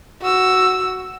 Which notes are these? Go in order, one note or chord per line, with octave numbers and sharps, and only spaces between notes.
F#4 E6